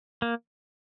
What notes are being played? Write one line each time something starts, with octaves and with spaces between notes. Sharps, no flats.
A#3